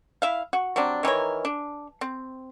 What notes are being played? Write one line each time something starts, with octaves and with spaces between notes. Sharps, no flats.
E4 E5 F5
F#4
F#3 G3 C4 D4
D#3 E3 A#4 C#5
D4
C4